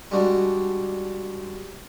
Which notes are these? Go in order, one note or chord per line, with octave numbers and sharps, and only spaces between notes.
G3 G#3 D4 F#4